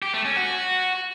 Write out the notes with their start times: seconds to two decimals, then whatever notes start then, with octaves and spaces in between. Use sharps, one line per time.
0.02 G4
0.14 A3
0.25 C#4
0.37 F#4